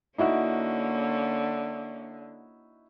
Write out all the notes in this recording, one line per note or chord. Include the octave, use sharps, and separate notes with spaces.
D3 A#3 C#4 D#4 E4 F#4